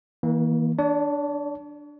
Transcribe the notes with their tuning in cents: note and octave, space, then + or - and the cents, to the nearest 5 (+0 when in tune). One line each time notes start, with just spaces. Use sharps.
E3 -35 A#3 +15
D4 +0 C#5 +45